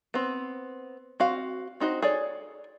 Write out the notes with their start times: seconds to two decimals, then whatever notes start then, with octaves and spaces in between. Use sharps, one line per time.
0.14 B3 C4
1.20 C4 F#4 F5
1.80 C4 D#4 F#4 C5
2.02 G#4 A4 C#5 D5